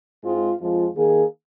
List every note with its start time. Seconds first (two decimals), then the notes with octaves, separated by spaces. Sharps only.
0.23 G#2 G#3 C4 F4
0.59 F2 F3 G#3 F4
0.95 D#3 A#3 G#4